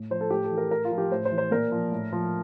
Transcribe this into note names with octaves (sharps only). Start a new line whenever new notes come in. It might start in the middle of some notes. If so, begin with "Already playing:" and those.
Already playing: A2
F3 C5
A4
A2 G4
A4
E3
A#4
A2 A#4
F4
F3
G4
A2 C5
C5
E3
C5
A#2 A#4
F3
A2
F3